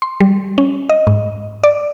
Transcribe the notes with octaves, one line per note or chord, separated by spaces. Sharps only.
C6
G3
C#4
D#5
G#2
D5